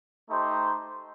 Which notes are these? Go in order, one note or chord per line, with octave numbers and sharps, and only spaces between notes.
A3 D#4 G4 C5